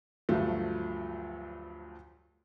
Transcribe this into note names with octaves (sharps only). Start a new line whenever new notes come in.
D2 G2 F3 F#3 A3